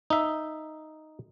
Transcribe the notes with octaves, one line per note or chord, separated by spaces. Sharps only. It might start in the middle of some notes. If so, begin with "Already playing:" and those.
D#4 E5